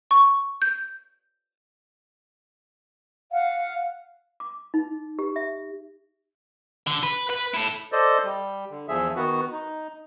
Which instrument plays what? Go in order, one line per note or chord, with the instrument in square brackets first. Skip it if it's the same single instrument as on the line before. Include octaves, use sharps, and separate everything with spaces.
[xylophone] C#6
G6
[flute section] F5 F#5
[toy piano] D6
D#4
G4
E5
[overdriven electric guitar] D3
B4
B4
E4 A4
[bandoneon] A4 C5 D5 D#5
G3
D3
E2 F3 G#4 E5
D#3 B3 F#4
D#4